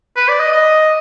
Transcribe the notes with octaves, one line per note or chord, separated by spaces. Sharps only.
B4
D5
D#5
D#5